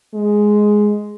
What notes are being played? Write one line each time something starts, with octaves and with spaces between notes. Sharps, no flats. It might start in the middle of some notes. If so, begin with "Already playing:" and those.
G#3